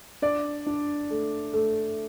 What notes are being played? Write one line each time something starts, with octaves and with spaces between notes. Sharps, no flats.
D4 D5
D4
A3
A3